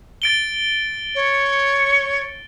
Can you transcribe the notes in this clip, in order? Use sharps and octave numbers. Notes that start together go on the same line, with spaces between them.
A6 D7 G7
C#5